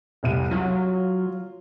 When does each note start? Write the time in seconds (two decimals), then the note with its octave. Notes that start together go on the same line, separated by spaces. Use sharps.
0.23 F1 C2 D#7
0.51 F#3 F4